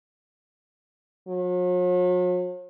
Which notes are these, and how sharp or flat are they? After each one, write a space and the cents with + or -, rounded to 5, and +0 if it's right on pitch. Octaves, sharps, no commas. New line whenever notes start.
F#3 -45